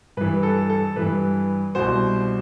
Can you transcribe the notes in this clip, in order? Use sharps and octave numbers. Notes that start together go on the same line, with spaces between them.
G2 E3 B4
A4
A4
G2 E3 B4
C2 B2 C5